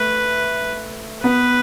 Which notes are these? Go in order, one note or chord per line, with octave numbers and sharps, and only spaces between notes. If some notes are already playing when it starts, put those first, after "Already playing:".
Already playing: A3 B4
B3 B4